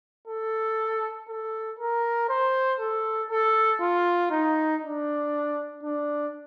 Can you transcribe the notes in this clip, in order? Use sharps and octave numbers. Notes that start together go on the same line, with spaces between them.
A4
A4
A#4
C5
A4
A4
F4
D#4
D4
D4